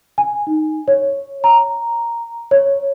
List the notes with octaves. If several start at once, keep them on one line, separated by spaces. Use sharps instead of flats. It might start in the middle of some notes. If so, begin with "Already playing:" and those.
G#5
D#4
C#5
A#5
C#5